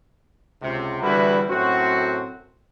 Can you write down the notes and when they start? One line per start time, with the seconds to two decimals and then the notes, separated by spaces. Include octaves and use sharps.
0.62 C#2 C3
1.02 E2 D3 G3 E4 F#4 B4
1.49 F#2 A2 C4 F#4